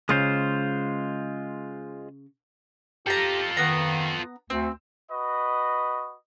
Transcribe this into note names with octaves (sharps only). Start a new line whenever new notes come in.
C#3 G#3 F4 C5
F4 G4 A4 G5 A#5
D#3 B3 A#5
D2 C4
F#4 B4 D#5